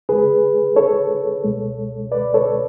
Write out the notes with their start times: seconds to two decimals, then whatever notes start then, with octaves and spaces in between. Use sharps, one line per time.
0.09 F2 C#3 G#3 G#4 B4
0.76 A4 C#5
1.44 C#2 B2 G#3
2.12 B4 D5
2.34 A4 C#5